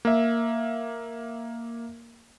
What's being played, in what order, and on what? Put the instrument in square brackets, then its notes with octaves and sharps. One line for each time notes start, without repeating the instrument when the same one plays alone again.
[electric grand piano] A#3 E5